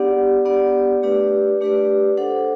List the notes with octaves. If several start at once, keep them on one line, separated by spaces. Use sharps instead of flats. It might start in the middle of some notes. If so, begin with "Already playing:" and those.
Already playing: B3 D4 G4 D5 F#5
B3 D4 G4 D5 F#5
A3 D4 G4 B4 D5
A3 D4 G4 B4 D5
D4 A4 C5 F#5